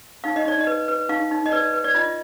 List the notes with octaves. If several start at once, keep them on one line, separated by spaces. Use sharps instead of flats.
D#4 F5
D#5
D#4 D5
D#5
B4
B4
D#4 F5
D#4
D#5
B4 D5
B4
D5
F4 D#5